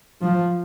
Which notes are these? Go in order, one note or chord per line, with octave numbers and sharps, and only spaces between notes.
F3